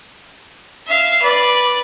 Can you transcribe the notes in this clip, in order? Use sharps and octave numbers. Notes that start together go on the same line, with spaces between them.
E5 F5
B4 D5